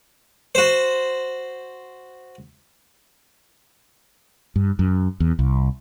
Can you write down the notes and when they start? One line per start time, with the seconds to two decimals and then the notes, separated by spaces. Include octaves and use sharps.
0.55 F#4 C5
4.56 G2
4.79 F#2
5.20 E2
5.39 C2